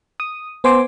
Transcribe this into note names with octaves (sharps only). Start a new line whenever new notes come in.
D#6
B3 C5 G#5 C6 D6